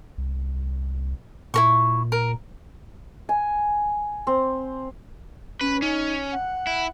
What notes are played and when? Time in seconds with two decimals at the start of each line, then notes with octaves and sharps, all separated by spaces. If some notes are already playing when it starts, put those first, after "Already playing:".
0.18 C2
1.54 A#2 E4 A#4 C#6
2.12 A#4
3.29 G#5
4.27 C4
5.61 C#4 B4
5.82 C#4 D#4
6.32 F#5
6.67 E4